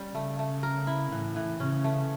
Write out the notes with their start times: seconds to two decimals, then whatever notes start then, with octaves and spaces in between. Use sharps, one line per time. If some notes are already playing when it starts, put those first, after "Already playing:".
Already playing: G3 C#4
0.14 C#3 A3
0.39 A3
0.63 A#4
0.87 E4
1.12 A2 E3
1.36 E3
1.60 C#3 C#4
1.84 A3